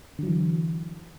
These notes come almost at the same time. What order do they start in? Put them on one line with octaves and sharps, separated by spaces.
D3 F#3 E3